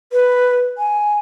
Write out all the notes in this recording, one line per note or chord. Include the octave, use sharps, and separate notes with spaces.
B4
G#5